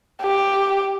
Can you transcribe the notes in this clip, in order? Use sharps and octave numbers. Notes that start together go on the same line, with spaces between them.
G4